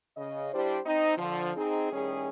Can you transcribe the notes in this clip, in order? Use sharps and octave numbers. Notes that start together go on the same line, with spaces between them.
C#3 D#5
G3 D4 E4 G4 C5
C4 D#4
D3 F3
C4 D#4 G#4
A2 D#3 G3 C#4 G#4